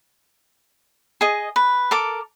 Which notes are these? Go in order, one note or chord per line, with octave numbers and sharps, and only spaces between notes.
G#4 D#5
B4
A4 A#4 D6